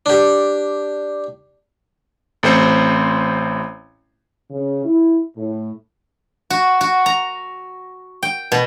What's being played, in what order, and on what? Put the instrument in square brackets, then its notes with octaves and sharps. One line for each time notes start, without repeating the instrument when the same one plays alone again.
[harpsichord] D4 G4
[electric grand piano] A1 A3 C4 C5 C#7
[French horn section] C#3
E4
A2
[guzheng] F#4
F#4
A#5
G5
B2